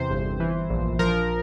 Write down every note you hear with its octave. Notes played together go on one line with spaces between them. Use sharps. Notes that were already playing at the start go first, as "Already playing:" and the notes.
Already playing: E2 C3 C5
G1
E3
A#1
F3 A#4